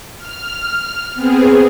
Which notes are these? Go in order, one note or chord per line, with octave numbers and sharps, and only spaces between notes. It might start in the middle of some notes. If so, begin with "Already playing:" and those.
F6
B3 C4 G#4